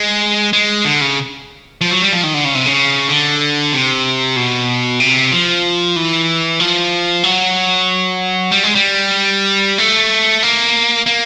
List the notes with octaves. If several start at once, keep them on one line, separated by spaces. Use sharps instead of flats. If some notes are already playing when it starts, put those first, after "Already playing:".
Already playing: G#3
G#3
D3
C#3
F3
F#3
G3
F3
D#3
D3
C#3
C3
C#3
D3
C3
B2
C3
F3
E3
F3
F#3
G3
G#3
G3
A3
A#3
A#3